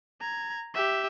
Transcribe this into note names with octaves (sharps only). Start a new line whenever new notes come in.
A#5 G#6
G4 E5